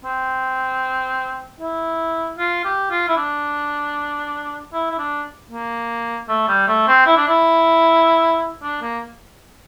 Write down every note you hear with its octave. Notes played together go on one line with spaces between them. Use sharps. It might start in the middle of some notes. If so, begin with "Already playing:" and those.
C4
E4
F4
G4
F4
E4
D4
E4
E4
D4
A#3
A3
G3
A3
C4
E4
D4
E4
D4
A#3